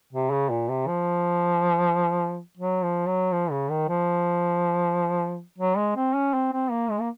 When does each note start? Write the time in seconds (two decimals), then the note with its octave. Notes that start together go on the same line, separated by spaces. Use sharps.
0.13 C3
0.31 C#3
0.50 A#2
0.69 C3
0.87 F3
2.57 F#3
2.83 F3
3.07 F#3
3.33 F3
3.51 C#3
3.70 D#3
3.89 F3
5.58 F#3
5.77 G#3
5.96 C4
6.15 C#4
6.34 C4
6.53 C4
6.71 A#3
6.90 G#3
7.00 A#3